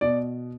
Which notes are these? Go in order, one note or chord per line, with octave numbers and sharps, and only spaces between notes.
B2 D5